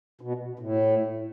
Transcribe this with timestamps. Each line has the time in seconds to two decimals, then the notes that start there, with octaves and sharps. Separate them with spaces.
0.21 B2
0.59 A2